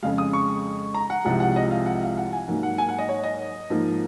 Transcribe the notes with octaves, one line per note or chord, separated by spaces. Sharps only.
F2 C#3 G#3 F5
D#6
C#6
A#5
F#5
C2 C3 F3 G#3 F#5
F#5
D#5
F5
F#5
F5
F#5
G#5
G#2 F#3 A#3
F#5
G#5
F#5
D#5
C#5
D#5
G#2 F3 A#3